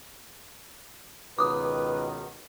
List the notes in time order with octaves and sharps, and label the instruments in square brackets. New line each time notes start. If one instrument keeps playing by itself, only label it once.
[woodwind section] C#2 B2 D#3 [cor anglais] B4 [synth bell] D6 D#6